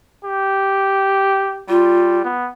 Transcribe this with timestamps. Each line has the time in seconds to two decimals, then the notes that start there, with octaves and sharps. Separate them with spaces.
0.25 G4
1.69 G3 F4
2.24 B3